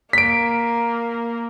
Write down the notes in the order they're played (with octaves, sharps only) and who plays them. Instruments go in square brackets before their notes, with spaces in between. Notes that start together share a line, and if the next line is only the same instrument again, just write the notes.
[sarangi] A#3 [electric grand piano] B6 D7